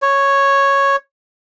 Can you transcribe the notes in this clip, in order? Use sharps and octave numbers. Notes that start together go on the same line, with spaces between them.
C#5